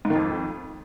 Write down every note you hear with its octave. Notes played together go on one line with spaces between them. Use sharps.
G#2
D#3
F2